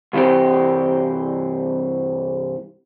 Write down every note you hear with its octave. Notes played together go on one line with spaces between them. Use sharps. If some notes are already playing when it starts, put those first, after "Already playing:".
C2 G2 E3 C4 G4